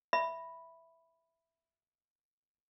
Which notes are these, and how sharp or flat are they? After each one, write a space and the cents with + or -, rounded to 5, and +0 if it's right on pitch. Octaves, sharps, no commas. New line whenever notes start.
E5 +0 B5 +0